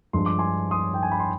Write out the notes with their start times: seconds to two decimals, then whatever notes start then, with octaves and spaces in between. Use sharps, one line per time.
0.13 G2 F3 G#3 D4 C6
0.26 D6
0.39 G#5 C6
0.71 C6 D#6
0.94 G5
1.03 G#5
1.11 B5
1.20 C6